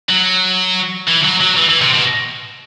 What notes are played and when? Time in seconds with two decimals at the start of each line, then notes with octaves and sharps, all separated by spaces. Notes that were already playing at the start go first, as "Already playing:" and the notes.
0.09 F#3
1.08 E3
1.24 F#3
1.41 F#3
1.57 E3
1.69 E3
1.81 C3
1.94 B2